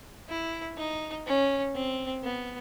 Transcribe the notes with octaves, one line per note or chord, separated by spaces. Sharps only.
E4
D#4
C#4
C4
B3